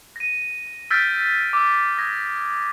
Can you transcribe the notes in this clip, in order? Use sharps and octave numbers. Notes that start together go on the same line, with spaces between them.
A#6 D#7
E6 F6 G6 A6 B6 D7
D6 E6
D#6 G#6 A#6